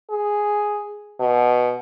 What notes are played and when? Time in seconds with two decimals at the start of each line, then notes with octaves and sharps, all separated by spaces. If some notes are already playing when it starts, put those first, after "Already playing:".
0.10 G#4
1.20 B2